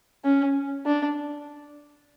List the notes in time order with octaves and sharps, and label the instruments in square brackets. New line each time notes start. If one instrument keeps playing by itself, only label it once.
[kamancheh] C#4
D4